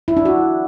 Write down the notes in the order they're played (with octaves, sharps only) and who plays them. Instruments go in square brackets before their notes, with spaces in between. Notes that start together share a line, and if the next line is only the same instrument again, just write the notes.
[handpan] E4
D4
F#4